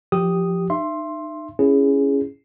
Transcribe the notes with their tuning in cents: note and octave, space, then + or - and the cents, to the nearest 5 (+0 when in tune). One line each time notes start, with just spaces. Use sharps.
F3 -5 G4 +0 D#6 +0
D#4 -35 E5 +30 C6 +10
C#4 +0 E4 +10 G#4 +0